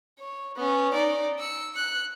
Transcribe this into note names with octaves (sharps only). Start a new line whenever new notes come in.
C#5
B3 C#4
D#4 D5
E6 C#7
F#6 C#7